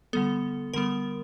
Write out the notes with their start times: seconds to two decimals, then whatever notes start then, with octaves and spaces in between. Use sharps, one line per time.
0.13 D3 G3 B3 A4
0.74 D3 G3 B3 A#4